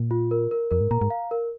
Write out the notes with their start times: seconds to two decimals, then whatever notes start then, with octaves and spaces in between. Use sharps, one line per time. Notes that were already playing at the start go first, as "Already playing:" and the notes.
Already playing: A#2
0.11 F4
0.31 A#4
0.51 A#4
0.71 F2 A#4
0.81 G#2
0.91 A#2 A#5
1.01 G#2
1.10 F5
1.31 A#4